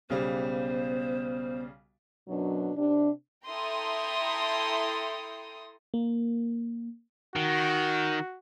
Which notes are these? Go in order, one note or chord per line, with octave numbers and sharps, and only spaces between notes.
B1 C#3 G3 B3 C5
F#2 B2 F#3 D4
C3 D4
E4 A4 G5 A#5 C6 D#6
A#3
D#3 F#4